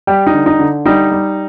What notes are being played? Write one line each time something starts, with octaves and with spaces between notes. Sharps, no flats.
G3 G4
D#4
D3
D#4
D3
G3 D#4
G3